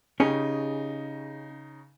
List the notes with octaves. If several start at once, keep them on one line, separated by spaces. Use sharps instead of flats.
C#3 C#4 D#4 G4 G#4